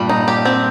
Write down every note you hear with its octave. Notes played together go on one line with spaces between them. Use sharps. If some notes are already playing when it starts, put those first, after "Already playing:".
Already playing: G2 A#2 G3
D#4
G4
C4